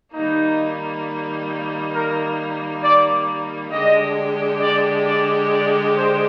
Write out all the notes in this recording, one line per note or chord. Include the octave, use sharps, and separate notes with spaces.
D#3 G3 A#3 D#4
A#4
D5
D3 G#3 D4 G4 D#5
D5
D5
D5
C5